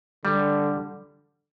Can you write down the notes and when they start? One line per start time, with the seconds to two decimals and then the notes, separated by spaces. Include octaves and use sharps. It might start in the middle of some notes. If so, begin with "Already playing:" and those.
0.25 D3 G3